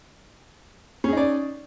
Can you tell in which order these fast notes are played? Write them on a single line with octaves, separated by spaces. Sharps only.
C#4 G#4 D#4 D5